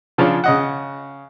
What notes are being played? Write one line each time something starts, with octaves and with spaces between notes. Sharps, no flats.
C#3 F3 D4 F4 C#5
C#3 D#5 F#5